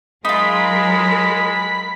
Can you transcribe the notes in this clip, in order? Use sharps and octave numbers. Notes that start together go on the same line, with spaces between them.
F#3 G#3 D#4 F4 G#4 A#4 B5